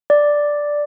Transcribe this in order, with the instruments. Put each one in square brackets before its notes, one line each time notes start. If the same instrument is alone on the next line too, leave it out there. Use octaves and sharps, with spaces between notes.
[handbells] D5